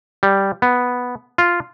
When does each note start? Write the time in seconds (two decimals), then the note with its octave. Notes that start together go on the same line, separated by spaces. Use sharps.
0.23 G3
0.62 B3
1.38 F4